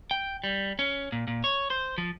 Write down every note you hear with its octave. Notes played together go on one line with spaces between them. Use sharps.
G5
G3
C#4
A#2
A#2
C#5
C5
F3